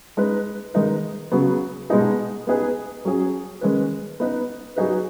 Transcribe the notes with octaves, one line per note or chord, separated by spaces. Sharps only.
G#3 D#4 B4
D#3 G#3 D#4 B4
C#3 F#3 B3
B2 G#3 B3 D#4 G#4
B3 D#4 G#4 B4
F#3 C#4 G#4
D#3 G#3 C#4 B4
B3 D#4 B4
F#3 D#4 G#4 B4